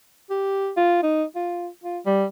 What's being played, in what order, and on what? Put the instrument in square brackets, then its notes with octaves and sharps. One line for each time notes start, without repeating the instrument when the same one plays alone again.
[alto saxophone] G4
F4
D#4
F4
F4
G3